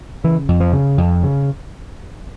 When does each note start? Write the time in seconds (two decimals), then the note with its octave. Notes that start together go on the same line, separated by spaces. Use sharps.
0.24 C#3 E3
0.48 F2
0.60 F3
0.73 C#3
0.98 F2
1.23 C#3